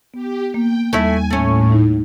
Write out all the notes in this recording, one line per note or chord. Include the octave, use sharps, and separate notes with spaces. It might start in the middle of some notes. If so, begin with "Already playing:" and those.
B3 G4
A#3 G5
D#2 G3 A3 E4 E5 G#5
A2 A3 C#4
D#4